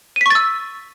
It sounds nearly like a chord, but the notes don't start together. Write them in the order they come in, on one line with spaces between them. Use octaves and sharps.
D#7 B6 C#6 A6 E6